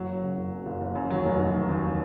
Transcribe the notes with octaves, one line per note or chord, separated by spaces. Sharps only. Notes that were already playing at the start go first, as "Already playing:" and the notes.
Already playing: F#1 F#3
F#2
C#3
F#1
F#2
F#1
F#1
F#2
D#2 F#3
F1
F1
F1
D#2